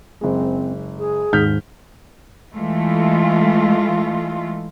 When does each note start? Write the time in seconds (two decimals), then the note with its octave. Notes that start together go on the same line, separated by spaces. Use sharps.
0.21 F#1 G#3 C4
0.98 G#4
1.33 D#2 G#2 D#3 F6 G6 B6
2.52 E3 G#3 A3 F4